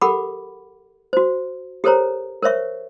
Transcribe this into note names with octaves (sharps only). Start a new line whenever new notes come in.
G4 A4 A#4 F#5 B5 D6
F#4 C5
G4 A4 A#4 C5 C#5 A#5
A#4 C5 C#5 E5 C#6